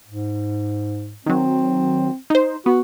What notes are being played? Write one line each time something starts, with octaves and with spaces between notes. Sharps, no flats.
G#2
D#3 F#3 C4
D#4 C5
B3 F#4